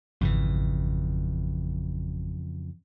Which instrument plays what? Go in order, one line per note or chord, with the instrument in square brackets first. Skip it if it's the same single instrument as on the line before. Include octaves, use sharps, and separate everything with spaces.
[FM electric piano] G#1 [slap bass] F2 C#3 E3